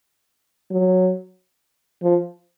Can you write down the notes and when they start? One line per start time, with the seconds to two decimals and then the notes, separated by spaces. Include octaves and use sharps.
0.71 F#3
2.02 F3